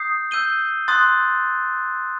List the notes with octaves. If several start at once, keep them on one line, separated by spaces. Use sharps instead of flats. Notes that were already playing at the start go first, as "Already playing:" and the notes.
Already playing: D#6 G6 C7
E6 G6 D#7 G7
C6 D#6 F#6 A6